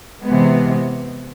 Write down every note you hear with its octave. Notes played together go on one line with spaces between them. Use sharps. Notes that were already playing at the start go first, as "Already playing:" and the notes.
C3 E3 G#3 B3